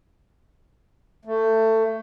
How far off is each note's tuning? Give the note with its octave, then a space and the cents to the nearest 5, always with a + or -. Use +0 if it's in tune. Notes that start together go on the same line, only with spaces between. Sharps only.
A3 +20